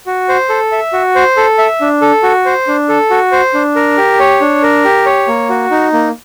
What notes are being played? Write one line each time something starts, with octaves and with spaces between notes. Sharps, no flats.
F#4
C5
A4
E5
F#4
C5
A4
E5
D4
A4
F#4
C5
D4
A4
F#4
C5
D4
A#4
G4
C#5
D4
A#4
G4
C#5
A#3
F#4
D#4
A#3